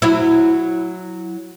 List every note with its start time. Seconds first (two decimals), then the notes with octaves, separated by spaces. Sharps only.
0.02 F#3 E4